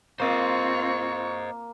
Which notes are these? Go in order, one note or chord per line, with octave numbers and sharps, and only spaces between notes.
A#3 C4 F4 C5 D#5 C#6